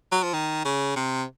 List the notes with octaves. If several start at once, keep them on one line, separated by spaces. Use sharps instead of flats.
F#3
F3
D#3
C#3
C3